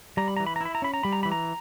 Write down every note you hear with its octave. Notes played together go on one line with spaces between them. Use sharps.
G3 A#5
B5
E3 A#5
B5
A#5
E4 B5
A#5
C#4 B5
A#5
G3 B5
A#5
E3 B5
A#5